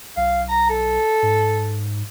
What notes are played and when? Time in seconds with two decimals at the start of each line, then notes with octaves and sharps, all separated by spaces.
0.17 B1 F5
0.49 A#5
0.70 A4
1.22 G#2